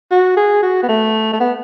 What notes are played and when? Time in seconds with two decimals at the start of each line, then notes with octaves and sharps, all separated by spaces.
0.11 F#4
0.37 G#4
0.63 F#4
0.83 B3
0.89 A3
1.33 A3
1.40 B3